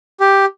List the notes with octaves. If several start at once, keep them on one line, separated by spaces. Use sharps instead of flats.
G4